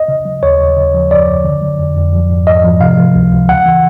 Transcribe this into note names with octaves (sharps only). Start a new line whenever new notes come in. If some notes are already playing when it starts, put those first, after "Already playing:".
Already playing: D#5
C#3
F#3
D#2 C#5
D#2
C#3
F3
F#2 D5
F#2
D3
F#3
F2
F2
F3
G#2
G#2 D#5
F3
C3 F5
F3
C#2
C#2
C#3 F#5
E3